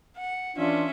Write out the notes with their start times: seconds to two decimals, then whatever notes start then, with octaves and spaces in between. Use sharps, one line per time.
0.17 F#5
0.57 E3 C#4 D4 F4 E5